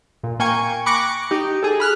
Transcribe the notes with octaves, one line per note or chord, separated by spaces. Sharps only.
A#2
A#3 G5 G#5 C#6
B5 C#6 D6 F#6 A#6 C#7
D#4 G4
G#4 A4
B5 F6 F#6